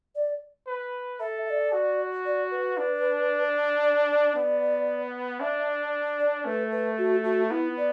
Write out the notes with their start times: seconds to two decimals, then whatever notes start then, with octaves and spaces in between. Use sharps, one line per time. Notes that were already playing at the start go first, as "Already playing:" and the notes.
0.15 D5
0.67 B4
1.20 A4 E5
1.46 E5
1.50 D5
1.72 F#4
2.25 D5
2.51 B4
2.78 D4
3.83 D5
4.09 D5
4.36 B3
5.40 D4 E5
5.67 D5
6.19 D5
6.45 A3 B4
6.72 B4
6.98 F#4
7.25 F#4
7.50 B3 E4
7.77 D5